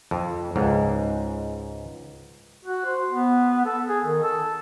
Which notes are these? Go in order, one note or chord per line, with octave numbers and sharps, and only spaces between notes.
F2
C#2 G#2
F#4
C5
B3
A4
G#4
D#3
A4